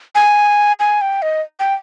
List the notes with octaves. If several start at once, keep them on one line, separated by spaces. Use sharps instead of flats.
G#5
G#5
G5
D#5
G5